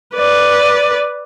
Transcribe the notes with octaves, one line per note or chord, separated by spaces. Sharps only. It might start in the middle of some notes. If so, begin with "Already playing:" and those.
B4 D5